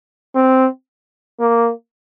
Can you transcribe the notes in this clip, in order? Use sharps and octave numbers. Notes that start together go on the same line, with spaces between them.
C4
A#3